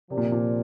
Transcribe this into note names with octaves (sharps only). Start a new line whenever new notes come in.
C3 F3 C4 A#4 D5
A#2
A#2